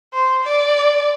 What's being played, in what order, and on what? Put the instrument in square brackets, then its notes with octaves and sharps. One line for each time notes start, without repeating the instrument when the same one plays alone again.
[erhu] C5
D5